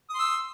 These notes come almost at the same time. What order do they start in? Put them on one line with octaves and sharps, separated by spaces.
D#6 C6 E6